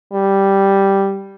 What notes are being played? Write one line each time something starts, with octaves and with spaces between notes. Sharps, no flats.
G3